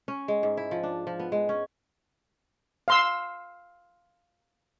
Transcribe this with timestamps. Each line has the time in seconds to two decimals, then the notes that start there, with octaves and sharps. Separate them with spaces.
0.08 C#4
0.28 G#3
0.43 G#2
0.57 E4
0.71 F3
0.83 D4
1.07 F3
1.20 B3
1.32 G#3
1.49 C#4
2.88 F5 C6 E6